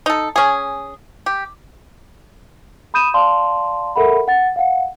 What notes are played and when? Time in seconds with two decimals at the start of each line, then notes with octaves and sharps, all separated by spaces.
0.06 D#4 A4
0.36 C#4 G#4
1.26 G4
2.94 B5 D#6 G6 D#7 E7
3.14 D5 F5 A5 C6
3.96 A4 A#4 E5 F#5 B5
4.28 F#5 A6
4.56 F5 F#5